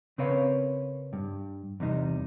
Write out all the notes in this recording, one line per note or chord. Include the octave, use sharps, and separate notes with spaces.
C#3 C4 A#4 B4 C#5 F5
G2
E2 C3 G3 D#4